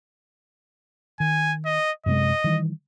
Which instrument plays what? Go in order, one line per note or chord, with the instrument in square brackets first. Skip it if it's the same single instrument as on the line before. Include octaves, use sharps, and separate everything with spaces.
[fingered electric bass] D#3 [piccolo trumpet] G#5
[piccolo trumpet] D#5
[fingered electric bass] F#2 C3 G#3 [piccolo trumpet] D#5
[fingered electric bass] D#3 E3 G3